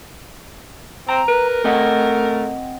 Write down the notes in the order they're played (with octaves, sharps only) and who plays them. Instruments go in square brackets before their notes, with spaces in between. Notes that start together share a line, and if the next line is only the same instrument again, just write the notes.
[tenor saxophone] C4 [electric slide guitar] A#5
[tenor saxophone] A#4 [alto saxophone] B4
[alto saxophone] A3 [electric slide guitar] C4 D#5 F#5